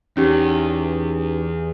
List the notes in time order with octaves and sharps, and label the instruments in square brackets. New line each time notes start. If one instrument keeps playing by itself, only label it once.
[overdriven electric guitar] E2 [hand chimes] C#4 D#4 G4